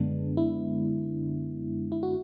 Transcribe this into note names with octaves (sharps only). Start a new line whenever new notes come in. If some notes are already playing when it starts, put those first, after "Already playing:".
Already playing: F#2 D3 G#3 B3 D4
E4
E4
F#4